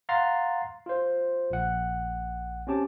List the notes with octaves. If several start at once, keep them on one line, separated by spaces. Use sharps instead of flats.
F5 F#5 A#5 C6 A6 C7
F4 C5
A#1 F#5
C4 C#4 G4 A5